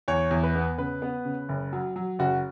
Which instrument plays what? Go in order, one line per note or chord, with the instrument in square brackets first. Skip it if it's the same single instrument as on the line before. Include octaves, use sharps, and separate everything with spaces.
[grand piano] E2 C#5
E2
B4
B3
C#3 B4
B3
C#3
F#1
F#3
F#3
F#1 F#4